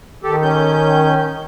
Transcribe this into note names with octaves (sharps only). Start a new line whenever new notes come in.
D#3 G4 A4
C#4 G6